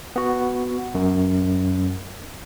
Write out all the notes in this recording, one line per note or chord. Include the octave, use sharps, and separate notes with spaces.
B3 F#4
F#2